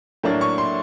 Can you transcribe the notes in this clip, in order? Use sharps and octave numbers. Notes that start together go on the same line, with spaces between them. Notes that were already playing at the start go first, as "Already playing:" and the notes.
A2 F#3 A#3 D4
C#6
C6